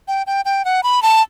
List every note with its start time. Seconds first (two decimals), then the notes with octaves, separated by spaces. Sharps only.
0.08 G5
0.27 G5
0.45 G5
0.65 F#5
0.83 B5
1.02 A5